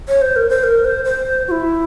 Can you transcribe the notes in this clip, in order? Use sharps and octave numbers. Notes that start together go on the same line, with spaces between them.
C#5
C5
A#4
C5
A#4
C5
C5
F#4
E4